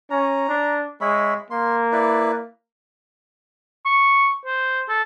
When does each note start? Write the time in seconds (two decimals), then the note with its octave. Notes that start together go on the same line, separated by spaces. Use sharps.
0.10 C#4 A#5
0.49 D4
1.01 G#3 C#5 E5 B5
1.50 A#3 C6
1.92 E4 B4 D5
3.85 C#6
4.45 C5
4.89 A4